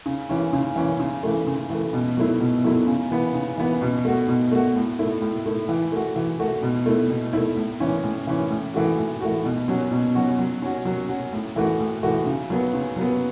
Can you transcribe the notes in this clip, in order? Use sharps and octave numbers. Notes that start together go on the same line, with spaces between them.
C#3
E3 C#4
C#3
E3 C#4
C#3
E3 A3
C#3
E3 A3
B2
F#3 A3 E4
B2
F#3 A3 E4
C#3
E3 B3
C#3
E3 B3
B2
A3 F#4
B2
A3 F#4
A2
A3 E4
A2
A3 E4
E3
A3 F#4
E3
A3 F#4
B2
A3 E4
B2
A3 E4
A2
E3 C#4
A2
E3 C#4
A2
E3 A3 F#4
A2
E3 A3 F#4
B2
F#3 C#4 F#4
B2
F#3 C#4 F#4
F#3
C#4 F#4
F#3
C#4 F#4
A2
E3 A3 F#4
A2
E3 A3 F#4
C#3
F#3 B3
C#3
F#3 B3